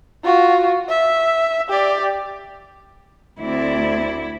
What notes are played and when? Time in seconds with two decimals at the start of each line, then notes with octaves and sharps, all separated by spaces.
0.25 F4 F#4
0.89 E5
1.69 G4 D5
3.41 D2 C4 E4 D5